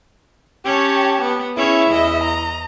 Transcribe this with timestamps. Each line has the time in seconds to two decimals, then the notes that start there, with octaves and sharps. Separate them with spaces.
0.65 C#4 G4 C#5 A5
1.21 B3
1.56 C#4 E4 G#4 C#5 E5
1.91 E2 D#5
2.23 A#5